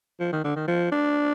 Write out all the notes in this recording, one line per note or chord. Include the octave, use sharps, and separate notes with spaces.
F3
D#3
D3
D#3
F3
D4